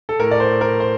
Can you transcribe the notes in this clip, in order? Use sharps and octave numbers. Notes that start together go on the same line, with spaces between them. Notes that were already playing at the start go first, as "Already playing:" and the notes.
A4
A2 A#4
D5
C5
A#4
C5